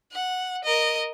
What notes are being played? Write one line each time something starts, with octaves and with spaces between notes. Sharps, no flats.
F#5
A#4 D#5